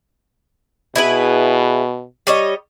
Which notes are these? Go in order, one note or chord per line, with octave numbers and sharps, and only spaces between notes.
B2 E4 G#4 B4
G3 C#5 D#5